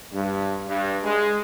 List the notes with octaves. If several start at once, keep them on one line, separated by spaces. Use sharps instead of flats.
G2
G2
G#3